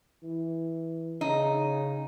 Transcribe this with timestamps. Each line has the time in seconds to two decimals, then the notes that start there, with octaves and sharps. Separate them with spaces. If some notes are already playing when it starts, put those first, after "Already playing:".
0.23 E3
1.21 C#3 D#4